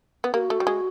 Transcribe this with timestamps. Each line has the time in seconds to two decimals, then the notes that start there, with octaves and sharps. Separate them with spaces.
0.24 B3
0.33 A#3 F#4 G4
0.50 A3
0.60 G3
0.67 G#3